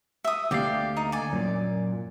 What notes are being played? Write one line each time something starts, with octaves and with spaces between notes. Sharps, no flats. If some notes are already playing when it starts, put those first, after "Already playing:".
E5 D#6
D2 A#3 G4 D5 F5
D#4
D5 G#5
F#2 A#2